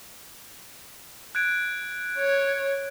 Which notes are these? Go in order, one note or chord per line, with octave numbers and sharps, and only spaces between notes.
F#6 G#6 D7
C#5